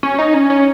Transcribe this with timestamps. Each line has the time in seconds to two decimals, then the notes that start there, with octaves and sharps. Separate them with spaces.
0.03 C#4
0.18 D#4
0.34 C#4
0.50 C#4